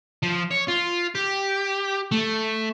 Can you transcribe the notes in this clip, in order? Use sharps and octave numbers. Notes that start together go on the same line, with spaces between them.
F3
C#5
F4
G4
A3